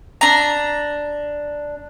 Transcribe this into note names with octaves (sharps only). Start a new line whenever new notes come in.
D4 A#5